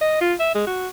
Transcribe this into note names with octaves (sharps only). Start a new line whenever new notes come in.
D#5
F4
E5
G#3
F#4